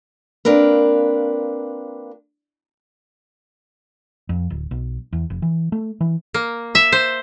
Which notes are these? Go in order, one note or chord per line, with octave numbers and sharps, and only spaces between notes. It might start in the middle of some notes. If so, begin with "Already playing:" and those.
A#3 C4 D4 F4 A#4 B4
F2
D1
B1
E2
F1
E3
A3
E3
A#3
E5
C5